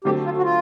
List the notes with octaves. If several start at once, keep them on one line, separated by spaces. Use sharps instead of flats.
D3 F#3 A3 C4 G4
F4
F#4
F4